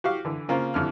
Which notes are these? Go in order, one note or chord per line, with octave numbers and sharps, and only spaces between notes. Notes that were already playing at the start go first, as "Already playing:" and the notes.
F#4 G4 F5
D3 E3
C#3 A#3 C4 F4
A1 F2 D3 F6